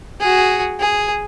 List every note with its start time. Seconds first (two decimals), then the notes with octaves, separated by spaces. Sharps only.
0.20 F#4 G#4
0.80 G#4